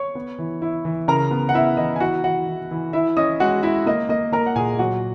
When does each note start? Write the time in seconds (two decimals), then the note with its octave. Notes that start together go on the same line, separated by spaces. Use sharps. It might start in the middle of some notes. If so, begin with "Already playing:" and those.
Already playing: C#5 C#6
0.15 B3
0.39 E3
0.62 E4
0.85 E3
1.08 C#3 A#4 A#5
1.31 B3
1.49 F#5
1.54 B3 E4 E5
1.77 E3 D#5
1.96 G#5
2.00 E4 F#4 F#5
2.24 E3 F#4 F#5
2.48 E3
2.71 E3
2.93 E3 E4 E5
3.17 C#4 D#5 D#6
3.40 G#3 F#4 F#5
3.63 E4 E5
3.86 A#3 D#5
4.09 A#3 D#5
4.32 A#3 A#4 A#5
4.46 F#5
4.56 A#2 G#4 G#5
4.79 F#3 F#4 F#5